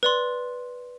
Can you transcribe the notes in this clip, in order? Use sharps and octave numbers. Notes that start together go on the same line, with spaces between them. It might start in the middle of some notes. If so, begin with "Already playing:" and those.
B4 D5 C6